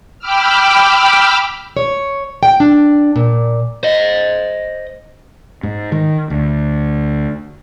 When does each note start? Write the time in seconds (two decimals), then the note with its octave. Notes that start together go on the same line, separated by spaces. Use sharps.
0.19 G5 B5 D6 E6 F6
1.77 C#5
2.43 G5
2.60 D4
3.16 A#2
3.83 C5 D#5
5.63 G#2
5.92 D#3
6.30 D2